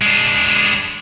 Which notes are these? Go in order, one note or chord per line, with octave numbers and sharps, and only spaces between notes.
G#3 D4